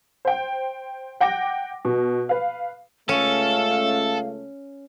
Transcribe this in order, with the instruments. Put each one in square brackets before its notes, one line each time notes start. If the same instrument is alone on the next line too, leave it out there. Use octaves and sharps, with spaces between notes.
[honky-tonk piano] C5 G5
F#5 G5 D6 A#6
B2
B4 F5
[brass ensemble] C#2 A3 [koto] C#4 [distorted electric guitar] A4 [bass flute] F5